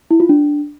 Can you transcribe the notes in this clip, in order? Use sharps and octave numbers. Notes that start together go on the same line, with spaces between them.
E4
F4
D4